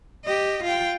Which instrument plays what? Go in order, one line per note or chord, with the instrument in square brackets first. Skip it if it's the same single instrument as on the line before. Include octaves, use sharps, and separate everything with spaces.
[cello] G4 D#5
F4 G5